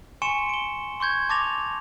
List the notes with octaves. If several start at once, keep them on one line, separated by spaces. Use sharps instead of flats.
G#5 C6 C#6 C#7 E7
D7 G7
C6 C#6 G6 G#6
A5 C#6 D6 A6 A#6 F7